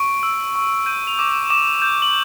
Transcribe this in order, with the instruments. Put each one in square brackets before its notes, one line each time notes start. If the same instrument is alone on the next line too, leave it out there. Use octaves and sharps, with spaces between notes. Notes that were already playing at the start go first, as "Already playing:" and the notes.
Already playing: [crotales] C#6 D7
E6
C#6
G6 D#7
F7
D6
E7
D6 E7
G6
F#7